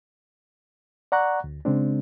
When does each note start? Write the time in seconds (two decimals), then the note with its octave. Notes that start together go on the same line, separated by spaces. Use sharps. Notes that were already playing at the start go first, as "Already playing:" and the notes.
1.12 D5 F#5 A#5 C#6 F#6
1.44 D2
1.65 C#3 G#3 C4 D4